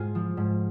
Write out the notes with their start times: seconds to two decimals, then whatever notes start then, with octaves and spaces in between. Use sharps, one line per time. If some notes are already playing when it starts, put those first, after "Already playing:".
Already playing: G#2 F4 G#4
0.15 F3
0.37 G#2